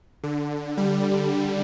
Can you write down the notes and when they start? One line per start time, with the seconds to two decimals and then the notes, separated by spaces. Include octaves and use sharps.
0.24 D3
0.77 G3